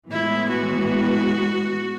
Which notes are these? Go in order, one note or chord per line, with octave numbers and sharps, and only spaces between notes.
A2 E3 G#3 B3 E4
F#4